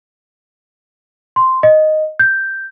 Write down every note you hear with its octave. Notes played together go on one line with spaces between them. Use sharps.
C6
D#5
G6